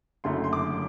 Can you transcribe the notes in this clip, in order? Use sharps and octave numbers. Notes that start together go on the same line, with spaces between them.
F#1 F#2 D3 A3 C6
C6
D6